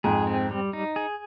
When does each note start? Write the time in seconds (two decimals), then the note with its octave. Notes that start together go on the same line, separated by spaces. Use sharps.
0.04 F2 G#2 G#4
0.27 C4
0.51 G3
0.73 D#4
0.96 G#4